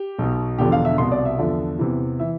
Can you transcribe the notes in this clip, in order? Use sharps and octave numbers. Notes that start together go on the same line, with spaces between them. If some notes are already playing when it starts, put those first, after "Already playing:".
Already playing: G4
B1 B2
E1 E2 D3 F3 G4
F5
E5
C2 B2 C6
D5
E5
E2 D3 F3
E2 C3 E3
E3 E5